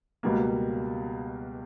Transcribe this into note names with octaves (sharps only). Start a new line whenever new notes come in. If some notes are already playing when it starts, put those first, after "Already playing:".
C#2 B2 G3 A#3